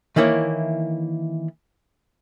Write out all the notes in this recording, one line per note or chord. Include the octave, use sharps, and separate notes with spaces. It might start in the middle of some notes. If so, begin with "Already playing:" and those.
D#3 E3 A#3 E4 C#5